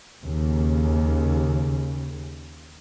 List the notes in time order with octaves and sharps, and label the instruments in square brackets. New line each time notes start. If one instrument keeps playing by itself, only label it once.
[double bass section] D#2 C#3